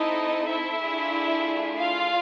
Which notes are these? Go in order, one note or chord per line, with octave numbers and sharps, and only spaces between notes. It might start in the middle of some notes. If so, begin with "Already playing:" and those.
Already playing: C4 D#4 E4 A4 D#5
E4 E5
A3 D4 F4 G#4
F4 F5